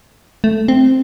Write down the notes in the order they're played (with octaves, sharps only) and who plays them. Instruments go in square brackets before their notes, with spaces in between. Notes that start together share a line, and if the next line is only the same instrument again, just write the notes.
[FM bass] A3
C4